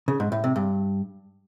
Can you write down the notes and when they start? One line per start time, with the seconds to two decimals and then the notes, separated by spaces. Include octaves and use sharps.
0.08 C#3
0.20 G#2
0.32 A2
0.44 C3
0.56 G2